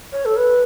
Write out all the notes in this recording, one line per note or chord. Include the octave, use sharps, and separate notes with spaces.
C#5
A4
B4